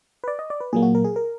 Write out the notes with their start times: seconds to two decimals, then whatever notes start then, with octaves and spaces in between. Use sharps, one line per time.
0.24 B4
0.28 D5
0.39 D#5
0.50 D5
0.61 B4
0.73 A#2 F#3 A#3 G#4
0.82 F#4
0.95 A#4
1.04 G#4
1.16 A#4